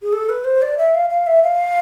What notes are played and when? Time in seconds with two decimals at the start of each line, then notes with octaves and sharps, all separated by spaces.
0.02 G#4
0.13 A4
0.29 B4
0.44 C5
0.62 D5
0.78 E5
0.94 F5
1.10 F5
1.27 E5
1.43 F5